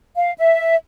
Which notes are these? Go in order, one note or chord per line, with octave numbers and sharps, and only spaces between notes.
F5
E5